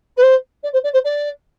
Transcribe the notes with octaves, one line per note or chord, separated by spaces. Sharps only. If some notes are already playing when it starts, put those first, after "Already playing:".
B4
C5
D5
C5
D5
C5
D5